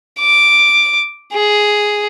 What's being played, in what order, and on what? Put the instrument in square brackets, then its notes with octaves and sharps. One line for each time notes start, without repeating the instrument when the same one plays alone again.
[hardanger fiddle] D6
G#4